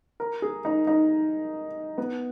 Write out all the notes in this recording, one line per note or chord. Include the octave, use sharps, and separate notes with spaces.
A#4
G#4
D#4
D#4
B3